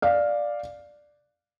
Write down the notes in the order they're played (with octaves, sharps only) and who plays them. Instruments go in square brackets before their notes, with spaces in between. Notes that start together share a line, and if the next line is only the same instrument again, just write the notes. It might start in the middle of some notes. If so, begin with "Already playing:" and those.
[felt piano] D5 F5